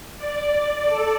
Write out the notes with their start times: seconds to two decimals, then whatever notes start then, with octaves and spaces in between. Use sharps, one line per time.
0.17 D5
0.85 A4